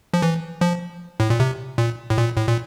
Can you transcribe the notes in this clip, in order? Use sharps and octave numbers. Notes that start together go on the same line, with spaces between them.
F3
E3
F3
A2
A#2
C3
A#2
A2
A#2
A2
A#2